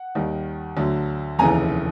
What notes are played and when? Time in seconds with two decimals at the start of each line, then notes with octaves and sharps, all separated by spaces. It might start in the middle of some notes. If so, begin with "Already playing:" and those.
Already playing: F#5
0.15 D#2 D#3 G3
0.77 D2 D3 F#3
1.39 F1 D#2 C#3 E3 G#5 A#5